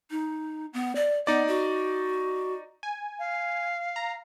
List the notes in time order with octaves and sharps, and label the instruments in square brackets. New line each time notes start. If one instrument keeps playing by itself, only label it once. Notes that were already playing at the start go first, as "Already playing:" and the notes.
[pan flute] D#4
B3
D5
[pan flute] B3 [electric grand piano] D#4 D5
[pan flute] F#4
[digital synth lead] G#5
[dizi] F5
[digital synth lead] A#5